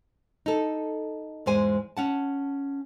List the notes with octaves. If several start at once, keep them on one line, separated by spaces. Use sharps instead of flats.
D#4 A4
E2 G#2 G#3 C5 G#5
C#4 F#5 A5